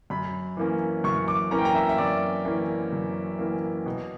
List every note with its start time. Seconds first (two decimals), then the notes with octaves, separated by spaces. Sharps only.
0.10 F#2 B5
0.57 E3 A#3 C#4
1.04 F#2 C#6
1.28 D6
1.51 E3 A#3 C#4 A#5
1.59 G5
1.65 A#5
1.75 E5
1.89 E5
1.98 F#2 D5
2.45 E3 A#3 C#4
2.93 F#2
3.39 E3 A#3 C#4
3.86 B2